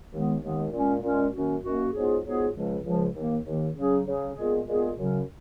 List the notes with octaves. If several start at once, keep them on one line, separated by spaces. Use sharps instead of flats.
D#2 D#3 G#3 B3
D#2 D#3 G#3 B3
A#2 G#3 C#4
A#2 G#3 C#4
F#2 D#3 A#3 C#4 F#4
F#2 D#3 A#3 C#4 F#4
G#2 F#3 B3 F4 G#4
G#2 F#3 B3 F4 G#4
C#2 C#3 F3 G#3
C#2 C#3 F3 G#3
D#2 D#3 A#3
D#2 D#3 A#3
C#3 F#3 C#4 G#4
C#3 F#3 C#4 G#4
A#2 G#3 B3 F4 G#4
A#2 G#3 B3 F4 G#4
F#2 C#3 F#3 C#4